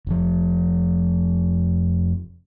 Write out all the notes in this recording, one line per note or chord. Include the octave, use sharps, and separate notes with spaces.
F1 F3